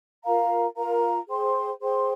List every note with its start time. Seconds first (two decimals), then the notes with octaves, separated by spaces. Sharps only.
0.24 F4 A#4 F5 A#5
0.76 F4 A#4 F5 A#5
1.28 G#4 C5 G5 C6
1.80 G#4 C5 G5 C6